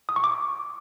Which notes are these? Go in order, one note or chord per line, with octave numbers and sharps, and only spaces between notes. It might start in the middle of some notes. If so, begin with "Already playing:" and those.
D#6
C#6
D6